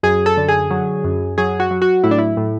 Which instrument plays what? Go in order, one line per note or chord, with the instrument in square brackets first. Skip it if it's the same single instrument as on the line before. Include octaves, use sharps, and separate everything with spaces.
[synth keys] F#2 G#4
A4
D3
G#4
F#3
F#2
F#3 G#4
F#4
F#3
F#4
A2 E4
D4
E4
A2